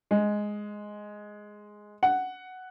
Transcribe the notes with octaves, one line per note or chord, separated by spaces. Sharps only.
G#3
F#5